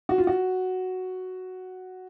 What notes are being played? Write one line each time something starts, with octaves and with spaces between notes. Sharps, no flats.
F#4
F4
F#4